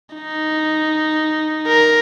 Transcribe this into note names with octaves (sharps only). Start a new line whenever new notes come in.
D#4
A#4